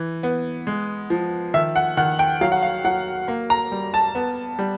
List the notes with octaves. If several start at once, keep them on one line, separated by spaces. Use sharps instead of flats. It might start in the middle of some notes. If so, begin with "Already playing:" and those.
Already playing: E3
B3
G#3
F3
D#3 E5
F#5
D#3 F#5
G5
F#3 F5
F#5
F5
F#3 F#5
A#3
A#5
G3
A5
B3
G3